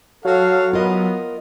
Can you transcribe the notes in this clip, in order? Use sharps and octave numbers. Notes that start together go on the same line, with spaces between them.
F#3 F#4 A4 F5
B3 F4 A#4 D#5